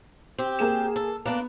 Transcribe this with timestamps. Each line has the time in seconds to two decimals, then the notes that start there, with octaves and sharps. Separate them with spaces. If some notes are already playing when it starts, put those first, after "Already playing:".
0.38 C4 G4
0.59 A#3 G#4 E7
0.96 A4
1.26 A#3 B3 D4